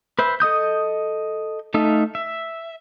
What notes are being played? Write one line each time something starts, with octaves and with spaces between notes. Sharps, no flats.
B4 C5 E5
A4 D#5 D#6 G6
A3 D#4 A4 E5 F5
E5